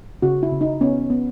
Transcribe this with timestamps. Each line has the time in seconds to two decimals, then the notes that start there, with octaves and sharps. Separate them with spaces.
0.22 C#3 F#4
0.43 E4
0.52 C#3
0.61 D#4
0.81 B3 C#4
1.10 B3